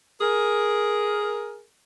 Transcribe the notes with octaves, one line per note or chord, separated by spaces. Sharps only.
G#4 A#4